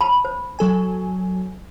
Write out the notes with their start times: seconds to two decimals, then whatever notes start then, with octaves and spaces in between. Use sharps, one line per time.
0.01 A5 B5
0.25 C5
0.59 F#3 A4 G#5